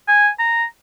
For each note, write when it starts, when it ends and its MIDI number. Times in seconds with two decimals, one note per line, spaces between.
0.08 0.29 80
0.39 0.64 82